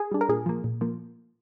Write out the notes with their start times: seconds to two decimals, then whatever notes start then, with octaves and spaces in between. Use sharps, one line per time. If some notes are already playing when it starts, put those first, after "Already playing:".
Already playing: G#4
0.11 G3 D4
0.21 A#4
0.29 A#2 G#4
0.46 F3 A#3
0.64 A#2
0.81 F3 A#3